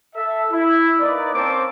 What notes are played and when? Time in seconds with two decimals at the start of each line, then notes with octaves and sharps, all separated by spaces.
0.15 A4 E5
0.51 E4
0.99 A#3 D#4 B4 D5
1.34 A#3 C4 C#4 C5 A5 D6